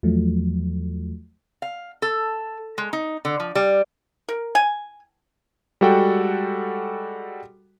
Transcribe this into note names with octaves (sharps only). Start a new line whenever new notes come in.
E2 F3 F#3 A3
F5
A4
G#3
D#4
D3
F3
G3
A#4
G#5
G3 G#3 F#4 A4 F#5 G5